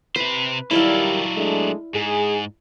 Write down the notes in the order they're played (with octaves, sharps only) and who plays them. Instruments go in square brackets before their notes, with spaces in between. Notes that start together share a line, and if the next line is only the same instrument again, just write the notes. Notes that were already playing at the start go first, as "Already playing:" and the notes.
[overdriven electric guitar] C3 C5 [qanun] B4
[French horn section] D#3 G3 [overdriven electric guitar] F#3 A4 [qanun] E4 D5 F5
[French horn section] G#3 A3 D4
[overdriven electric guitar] G#2 [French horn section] G#4